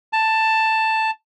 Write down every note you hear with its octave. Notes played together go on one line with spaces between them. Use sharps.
A5